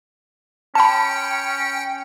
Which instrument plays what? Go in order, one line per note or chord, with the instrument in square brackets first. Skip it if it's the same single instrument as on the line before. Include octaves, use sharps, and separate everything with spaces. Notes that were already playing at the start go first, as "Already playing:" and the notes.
[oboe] C#4 [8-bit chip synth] G5 C#7 [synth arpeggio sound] A5 B5